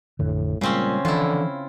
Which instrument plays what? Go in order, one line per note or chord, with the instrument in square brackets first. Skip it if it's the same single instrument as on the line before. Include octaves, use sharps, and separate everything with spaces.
[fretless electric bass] A1 F2 D3 [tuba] A2
[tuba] A#2 [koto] C#3 C4 C#4 [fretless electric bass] G3 G#3
[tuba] D3 [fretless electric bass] E3 F3 [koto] E4 F4